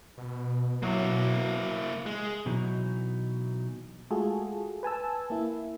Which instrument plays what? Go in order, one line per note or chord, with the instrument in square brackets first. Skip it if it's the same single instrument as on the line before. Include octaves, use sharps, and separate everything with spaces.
[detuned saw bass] B2
[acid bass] F#3 [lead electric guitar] A#3 E4
[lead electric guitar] G#3
[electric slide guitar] B2 E3 F#3 D#4
[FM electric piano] G#3 A3 F4 F#4 G#4 A4
B4 G#5 A5 E6
A#3 E4